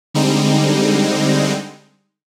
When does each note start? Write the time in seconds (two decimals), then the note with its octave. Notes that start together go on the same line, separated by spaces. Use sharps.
0.14 D3 G3 G#3 C4 D#4